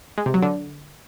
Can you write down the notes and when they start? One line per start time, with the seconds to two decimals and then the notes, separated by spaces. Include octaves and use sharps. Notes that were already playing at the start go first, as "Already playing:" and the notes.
0.18 G#3
0.26 C3
0.34 F#3
0.42 D3